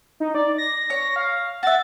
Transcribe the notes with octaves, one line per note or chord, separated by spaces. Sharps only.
D#4
D5
A#6
C#5
F5
F#4 E5 A6